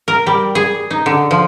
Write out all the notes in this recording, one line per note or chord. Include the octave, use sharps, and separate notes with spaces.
A#4
G3
G#4
D#4
D3
F3